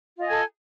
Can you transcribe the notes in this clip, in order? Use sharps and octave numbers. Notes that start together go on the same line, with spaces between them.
F4 A4 D#5 G#5